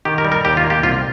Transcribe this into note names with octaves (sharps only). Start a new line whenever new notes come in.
D#3 G4
A#4
G3
A#4
D#2 G4
F4
A#3
G4
C2 F4